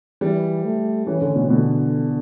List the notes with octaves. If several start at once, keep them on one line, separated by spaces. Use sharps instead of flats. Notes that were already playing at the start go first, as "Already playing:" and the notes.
E3 G3
A3
E3 C#4
D3
B2
B2 D3